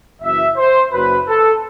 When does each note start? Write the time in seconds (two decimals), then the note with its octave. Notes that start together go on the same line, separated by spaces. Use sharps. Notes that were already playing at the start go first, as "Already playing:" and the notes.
0.22 F#1 F#2 E3 E5
0.56 C5
0.92 F#1 F#2 F#3 B4
1.27 A4